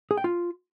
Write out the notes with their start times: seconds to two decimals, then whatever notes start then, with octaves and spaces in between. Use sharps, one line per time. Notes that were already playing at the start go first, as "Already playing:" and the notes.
0.11 G#4
0.17 G5
0.24 F4